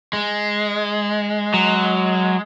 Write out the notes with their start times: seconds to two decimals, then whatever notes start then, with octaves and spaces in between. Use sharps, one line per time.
0.13 G#3
1.54 F#3